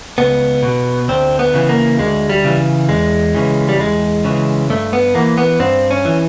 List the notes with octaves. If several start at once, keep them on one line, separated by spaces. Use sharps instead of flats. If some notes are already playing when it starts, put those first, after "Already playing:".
C#2 B3
B2
D2 C4
B3
C#3 E3
A#3
D2 G#3
G3
C#3 E3
E2 G#3
C#3 E3
G3
E2 G#3
C#3 E3
G2 A3
B3
E3 A#3
B3
G2 C4
C#4
E3